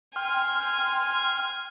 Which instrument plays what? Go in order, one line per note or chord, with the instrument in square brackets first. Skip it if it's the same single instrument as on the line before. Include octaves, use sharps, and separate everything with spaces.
[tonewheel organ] G5 C6 F6 [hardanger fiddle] G#5